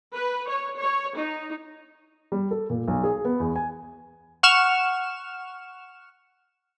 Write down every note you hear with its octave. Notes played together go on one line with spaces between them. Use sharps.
B4
C#5
C#5
D#4
G3
A4
A#2
B1
G#4
B3
E2
G#5
F#5 C#6 F6 E7